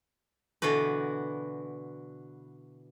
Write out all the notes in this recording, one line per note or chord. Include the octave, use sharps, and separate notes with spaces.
B2 D3 E3 F#4 B4